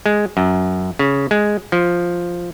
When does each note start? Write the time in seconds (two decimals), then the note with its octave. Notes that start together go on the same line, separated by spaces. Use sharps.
0.06 G#3
0.37 F#2
0.99 C#3
1.31 G#3
1.72 F3